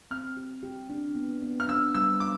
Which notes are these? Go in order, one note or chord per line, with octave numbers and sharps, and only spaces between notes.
C4 F6
G4
G4
D4
B3
B3
F6
D4 E6
G3 E6
D4 D6